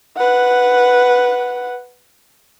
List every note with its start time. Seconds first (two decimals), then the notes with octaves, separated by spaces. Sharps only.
0.17 B4 F#5